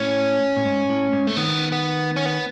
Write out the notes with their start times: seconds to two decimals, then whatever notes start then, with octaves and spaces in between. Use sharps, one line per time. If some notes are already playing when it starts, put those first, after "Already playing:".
Already playing: A2 C#4
0.56 A2
0.65 G#2
0.90 A2
1.13 G#2
1.27 A3
1.36 D#3 B3
1.72 B3
2.16 C#4
2.26 B3